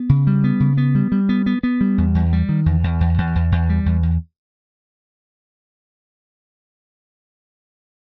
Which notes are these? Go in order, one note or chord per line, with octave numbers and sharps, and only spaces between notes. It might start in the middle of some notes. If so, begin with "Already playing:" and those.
Already playing: B3
C#3
G3
B3
C#3
B3
G3
G3
B3
B3
B3
G3
E2
E2
G3
D#3
E2
E2
E2
E2
E2
E2
G3
E2
E2